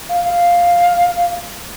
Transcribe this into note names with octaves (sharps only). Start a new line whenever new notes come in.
F5
F5